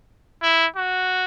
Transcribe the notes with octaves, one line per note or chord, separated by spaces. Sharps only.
E4
F#4